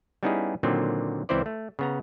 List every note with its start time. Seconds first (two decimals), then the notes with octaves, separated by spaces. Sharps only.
0.23 G3 B3 C#4 D#4 E4 G#4
0.63 A#2 D3 D#3 F#3 C4
1.29 C#2 E3 C4 E4 C5 D5
1.46 A3
1.79 C#3 B3 A#5